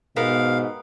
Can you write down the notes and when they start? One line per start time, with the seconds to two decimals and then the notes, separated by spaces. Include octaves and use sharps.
0.16 G#2 B2 B3 G4 A#4 F5